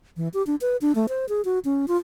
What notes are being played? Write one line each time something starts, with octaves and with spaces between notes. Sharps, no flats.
E3
G4
D4
B4
D4
A3
C5
G#4
F#4
C#4
F4